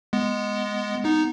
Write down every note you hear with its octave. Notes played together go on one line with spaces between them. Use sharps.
G#3 B3
B3 D#4